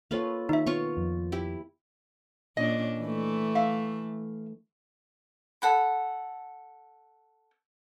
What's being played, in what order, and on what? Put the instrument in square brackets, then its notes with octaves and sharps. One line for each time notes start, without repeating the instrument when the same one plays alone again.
[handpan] A#3 A4 C#5 [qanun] F4 B4 F5
[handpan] D#3 [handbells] D#4 E5
[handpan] B3 [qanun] F4 C#5 C#6
[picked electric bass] F2
[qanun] E4 G4
[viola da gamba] A#2 C#4 D4 [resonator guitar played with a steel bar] D#5
[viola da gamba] E3 A3
[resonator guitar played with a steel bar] E5 F5
[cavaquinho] A4 F#5 B5